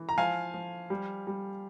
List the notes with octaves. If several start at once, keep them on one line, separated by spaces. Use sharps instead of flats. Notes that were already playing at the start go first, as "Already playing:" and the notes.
Already playing: E3
A#5
F3 F5 G#5
F3
G3
G3